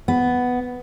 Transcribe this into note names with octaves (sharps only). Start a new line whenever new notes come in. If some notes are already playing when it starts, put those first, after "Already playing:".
B3